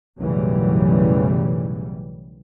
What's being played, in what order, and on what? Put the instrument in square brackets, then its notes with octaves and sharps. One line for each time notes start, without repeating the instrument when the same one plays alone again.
[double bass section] B1 F#2 A2 C#3 E3 G3